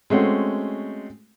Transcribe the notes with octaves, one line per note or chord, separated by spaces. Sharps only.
G#3 A3 C4 C#4 F#4